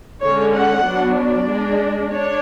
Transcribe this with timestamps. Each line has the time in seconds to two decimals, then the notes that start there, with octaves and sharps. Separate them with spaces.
0.21 D3 G#3 C#4 C#5
0.53 F#5
0.84 F#3 B3 D4
1.17 D5
1.48 G#3 D4
2.11 D4 C#5